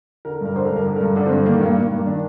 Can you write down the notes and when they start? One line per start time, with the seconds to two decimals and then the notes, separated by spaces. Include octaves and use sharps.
0.25 D3 A#4
0.41 G2 A#4
0.55 D3 C5
0.65 A#4
0.70 G2
0.76 A#4
0.86 D3
0.96 A#4
1.01 G2
1.16 D3 D4
1.26 C4
1.31 G2
1.45 D#3 A#3
1.56 A3
1.61 G2
1.66 A#3
1.76 D#3 A#3
1.91 G2 A#3
2.06 D#3 D4